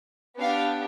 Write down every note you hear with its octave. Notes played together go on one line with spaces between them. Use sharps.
B3 D4 G4 F5